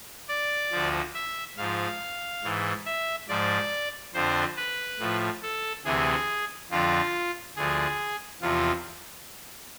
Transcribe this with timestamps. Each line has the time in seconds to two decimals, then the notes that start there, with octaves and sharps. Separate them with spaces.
0.28 D5
0.71 D2 D3 F3
1.14 E5
1.57 G#2 F3 F5
2.43 G#2 E3
2.86 E5
3.28 G#2 F3 D5
4.14 F2 D3 F3 C5
4.57 B4
4.99 A2 F3
5.43 A4
5.85 D2 C3 E3 G#4
6.70 F2 D3 F3 F4
7.56 D2 D3 F3 G#4
8.42 E2 C3 F3 F4